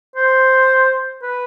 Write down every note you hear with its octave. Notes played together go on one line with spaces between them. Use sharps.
C5
B4